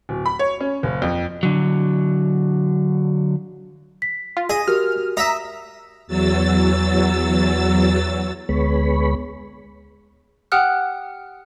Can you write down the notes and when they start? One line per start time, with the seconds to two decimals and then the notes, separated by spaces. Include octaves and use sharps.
0.09 D1
0.26 B5
0.39 C#5
0.60 C#4
0.83 F#1
1.02 F2
1.43 D3 F#3
4.02 B6
4.37 F4
4.49 G#4 D#5 D#6
4.68 F#4 G4 A#4 F6
5.17 D#5 E5 A#5 B6
6.07 E2 F#3 E6 A6
8.49 D2 G#3 B3 C#5 B5
10.52 G4 F#5 G5 D#6 F6 F#6